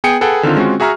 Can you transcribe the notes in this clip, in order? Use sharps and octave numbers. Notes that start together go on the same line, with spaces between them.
B3 G#4 G5 D#6 C#7
G#4 A4 B4 F#5 G5
D3 D#3 C4 F4
G#3 C4 C#4 F4 F#4
F#4 G#4 E5 A#5 C#6 F6